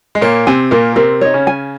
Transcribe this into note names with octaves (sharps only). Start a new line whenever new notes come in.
G#3
A#2 A#3 C#5
C3 C4 G#5
A#2 A#3 A#4
C3 C4 A#4
D#4 C#5
C#3 C#4
G#5